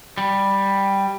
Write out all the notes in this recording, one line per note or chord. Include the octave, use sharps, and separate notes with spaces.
G3